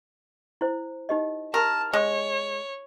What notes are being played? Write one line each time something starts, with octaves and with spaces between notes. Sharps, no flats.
E4 C5
D#4 G4 D#5
G4 A#4 A5
G#3 C#5